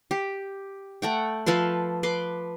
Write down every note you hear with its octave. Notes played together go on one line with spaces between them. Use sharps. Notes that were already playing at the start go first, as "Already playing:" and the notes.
G4
A3 F#5 G5
F3 A4 B4 C6
B4 C6 D6